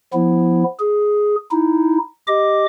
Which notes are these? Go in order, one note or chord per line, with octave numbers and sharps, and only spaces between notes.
F3 B3 E4
G#4
D#4 E4
G4 D#5 D6